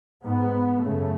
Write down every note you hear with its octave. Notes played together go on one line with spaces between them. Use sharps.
G#2 B3
F#2 C#3 A3